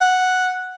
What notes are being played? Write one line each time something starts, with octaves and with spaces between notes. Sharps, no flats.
F#5